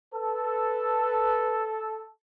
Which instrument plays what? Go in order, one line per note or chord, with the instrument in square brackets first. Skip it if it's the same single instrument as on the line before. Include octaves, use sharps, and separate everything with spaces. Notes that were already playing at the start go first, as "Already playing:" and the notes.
[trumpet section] A4 [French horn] B4